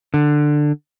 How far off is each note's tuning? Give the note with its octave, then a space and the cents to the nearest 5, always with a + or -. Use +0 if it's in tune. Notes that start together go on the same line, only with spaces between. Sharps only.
D3 +15